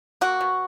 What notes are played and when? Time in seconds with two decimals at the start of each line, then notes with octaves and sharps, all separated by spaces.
0.21 A#3 F#4
0.41 B2